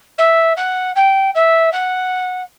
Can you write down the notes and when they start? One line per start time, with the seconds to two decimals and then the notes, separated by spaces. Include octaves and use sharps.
0.18 E5
0.56 F#5
0.95 G5
1.34 E5
1.72 F#5